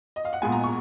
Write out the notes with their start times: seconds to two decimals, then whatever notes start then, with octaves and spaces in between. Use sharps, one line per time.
0.16 D#5
0.25 F5
0.33 F#5
0.42 A#2 G#3 B3 G#5
0.52 A#5
0.64 C#6